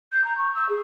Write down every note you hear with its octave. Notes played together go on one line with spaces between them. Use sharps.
G6
A#5
C#6
E6
G#4